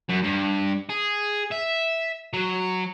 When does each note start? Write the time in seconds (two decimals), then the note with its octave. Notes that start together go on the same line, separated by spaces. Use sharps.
0.09 F#2
0.23 G2
0.89 G#4
1.51 E5
2.33 F#3